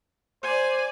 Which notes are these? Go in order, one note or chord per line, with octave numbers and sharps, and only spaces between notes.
C5 D5 G#5